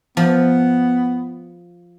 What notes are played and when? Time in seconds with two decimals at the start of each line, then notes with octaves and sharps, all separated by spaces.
0.17 F3 B3